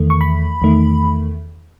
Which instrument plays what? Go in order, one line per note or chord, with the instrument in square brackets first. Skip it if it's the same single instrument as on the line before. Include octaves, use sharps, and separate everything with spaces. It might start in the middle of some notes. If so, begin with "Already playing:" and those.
Already playing: [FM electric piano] E2 D#3 A3
C#6
B5
E2 D#3 A3